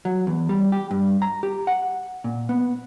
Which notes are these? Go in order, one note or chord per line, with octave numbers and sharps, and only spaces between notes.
F#3
E2
G3
G4
G2
A#5
G4
F#5
A#2
B3